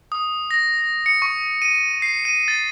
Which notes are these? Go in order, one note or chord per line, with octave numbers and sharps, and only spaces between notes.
D#6
A#6
C#7
C#6
D#7
C7
D#7
A6